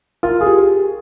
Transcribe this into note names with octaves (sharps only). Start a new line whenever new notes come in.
F4 A#4
G#4
G4